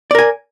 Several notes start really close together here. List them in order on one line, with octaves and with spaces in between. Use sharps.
D5 A#4 G#5